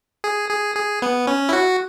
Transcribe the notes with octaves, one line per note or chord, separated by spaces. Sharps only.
G#4
G#4
G#4
B3
C#4
E4
F#4